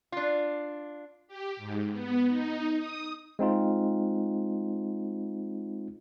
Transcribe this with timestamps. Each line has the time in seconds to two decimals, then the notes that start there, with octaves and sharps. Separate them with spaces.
0.12 D4 F4
1.28 G4
1.57 G#2
1.92 B3
2.27 D#4
2.75 D#6
3.39 G#3 C4 D#4 F4